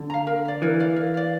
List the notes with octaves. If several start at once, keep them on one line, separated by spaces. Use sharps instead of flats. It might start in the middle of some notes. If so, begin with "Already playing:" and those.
Already playing: D3
F5 A#5
A#4
D5 F5
E3 A#4
D5 F5
A#4
D5 F5